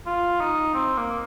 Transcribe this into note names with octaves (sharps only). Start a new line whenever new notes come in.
F4
D#4
C4
A#3